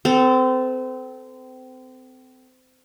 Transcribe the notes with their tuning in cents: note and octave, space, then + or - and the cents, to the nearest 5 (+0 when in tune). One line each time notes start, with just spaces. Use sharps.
C4 -30 A4 +0